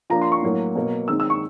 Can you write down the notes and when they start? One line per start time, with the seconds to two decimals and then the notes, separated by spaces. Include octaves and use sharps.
0.10 F3 A#3 D4 A#5
0.22 C6
0.32 C#6
0.43 A2 F#3 A#3
0.75 B2 F#3 A#3
1.08 D#3 G#3 C4 D#4 E6
1.20 E6
1.30 C#6